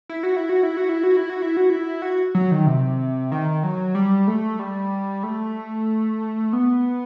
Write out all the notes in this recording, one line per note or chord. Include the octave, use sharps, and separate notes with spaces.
E4
F#4
E4
F#4
E4
F#4
E4
F#4
E4
F#4
E4
F#4
E4
F#4
F#3
D#3
C3
D#3
F#3
G3
A3
G3
A3
B3